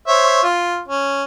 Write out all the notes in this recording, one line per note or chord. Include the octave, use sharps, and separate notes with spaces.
C5 C#5 E5
F4
C#4